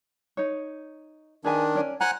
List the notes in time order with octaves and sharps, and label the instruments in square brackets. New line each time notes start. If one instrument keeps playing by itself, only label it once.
[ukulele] D#4 C#5
[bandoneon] D#3 D4 [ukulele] G#4 B4 G#5
[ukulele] C#4 D5 G#5
[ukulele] C5 A#5 [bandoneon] F#5 G#5 F#6